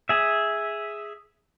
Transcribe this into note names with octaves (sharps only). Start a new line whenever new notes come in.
G#4 E5